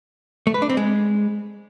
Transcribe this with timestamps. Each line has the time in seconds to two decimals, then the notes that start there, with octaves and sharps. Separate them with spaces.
0.47 A3
0.54 B4
0.62 D4
0.69 C4
0.77 G#3